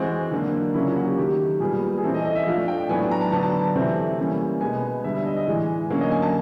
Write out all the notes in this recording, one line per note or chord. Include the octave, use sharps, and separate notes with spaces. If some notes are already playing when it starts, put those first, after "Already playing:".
Already playing: E3 G#3 C4 F#4
D3 F#3 A#3 D4
C#3 F#3 A#3 C#4 E4
F4
F#4
G4
D#3 F#3 A3 G4
A#2 G3 B3 G#4
G#4
E3 A3 C4 A4
D#5
D#5
E5
F3 A3 D4 F5
G5
A2 F#3 B3 D4 G#5
A#5
A5
D3 F#3 B3 D4 A5
A5
A5
C3 E3 A3 C4
E3 G3 A#3 C#4
B2 G#3 B3 G#5
D3 G3 B3 E5
E5
D#5
D#5
A2 E3 G#3
D3 F#3 A#3 C#4
D#5
G#5
A5